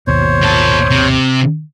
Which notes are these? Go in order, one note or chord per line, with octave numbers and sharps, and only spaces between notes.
G#1 D#2 B2 C5 C#5
A#2 A5
C3